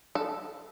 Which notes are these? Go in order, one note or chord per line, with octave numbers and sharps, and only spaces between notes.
A4